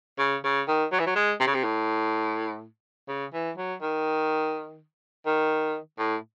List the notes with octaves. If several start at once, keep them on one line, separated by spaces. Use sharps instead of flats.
C#3
C#3
D#3
F#3
E3
F#3
G#3
C3
C#3
C3
A2
C#3
E3
F#3
D#3
D#3
A2